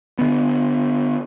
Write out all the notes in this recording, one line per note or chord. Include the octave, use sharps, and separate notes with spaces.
D3 B3